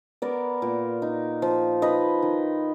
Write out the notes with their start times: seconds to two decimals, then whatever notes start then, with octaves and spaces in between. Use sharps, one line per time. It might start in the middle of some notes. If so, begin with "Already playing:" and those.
0.22 B3 A#4 D5
0.62 A#2
1.02 D#4
1.42 F3
1.82 D#4 B4 D#5
2.22 D#3